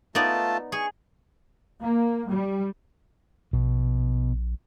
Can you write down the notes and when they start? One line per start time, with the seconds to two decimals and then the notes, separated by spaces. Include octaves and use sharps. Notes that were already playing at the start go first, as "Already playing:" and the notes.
0.15 A3 B3 D#4 F4 D5 A5
0.72 G#4 C#6
1.82 A#3
2.29 G3
3.53 A#1 B2